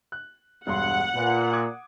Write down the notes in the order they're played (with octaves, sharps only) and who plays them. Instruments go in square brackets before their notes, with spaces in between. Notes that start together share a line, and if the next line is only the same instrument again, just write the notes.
[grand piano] F#6
[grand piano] E1 G2 C6 [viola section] F#5
[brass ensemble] A#2 [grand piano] B4
[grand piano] D6 D#6 G#6